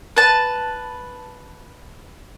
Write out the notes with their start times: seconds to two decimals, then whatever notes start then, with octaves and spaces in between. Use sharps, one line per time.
0.17 B4 A5